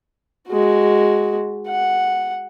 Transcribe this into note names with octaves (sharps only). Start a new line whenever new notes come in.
G#3 F#4
F#5